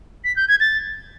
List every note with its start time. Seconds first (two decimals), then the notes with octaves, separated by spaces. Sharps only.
0.24 B6
0.36 G6
0.48 G#6
0.60 A6